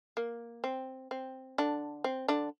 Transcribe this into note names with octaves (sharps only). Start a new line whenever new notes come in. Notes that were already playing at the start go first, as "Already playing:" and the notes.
A#3
C4
C4
D3 D4
C4
D3 D4